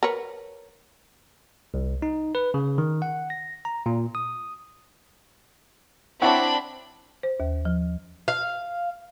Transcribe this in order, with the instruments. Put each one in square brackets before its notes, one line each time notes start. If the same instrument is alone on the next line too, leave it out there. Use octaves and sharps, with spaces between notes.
[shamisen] A#4 B4 C#5
[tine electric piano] C2
D#4
B4
C#3
D#3
F#5
A#6
A#5
A#2
D#6
[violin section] C4 D4 B5 [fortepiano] E4 C#5 F#5
[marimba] C5
D#2
F3
[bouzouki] F5